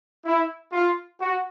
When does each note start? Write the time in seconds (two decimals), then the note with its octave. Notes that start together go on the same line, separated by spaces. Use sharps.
0.25 E4
0.72 F4
1.20 F#4